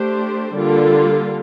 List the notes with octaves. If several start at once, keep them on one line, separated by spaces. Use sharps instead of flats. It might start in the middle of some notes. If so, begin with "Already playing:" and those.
Already playing: A3 D4 G4 C5
D3 G3 A#3 F4 A4